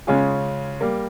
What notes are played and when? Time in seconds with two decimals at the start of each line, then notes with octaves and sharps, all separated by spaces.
0.07 C#3 G#3 C#4 F4 G#4
0.81 G3 A#3